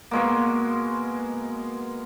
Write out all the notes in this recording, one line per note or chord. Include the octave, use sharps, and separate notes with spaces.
B2 G#3 A#3